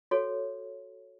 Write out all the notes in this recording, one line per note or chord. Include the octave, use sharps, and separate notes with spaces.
F#4 A4 C#5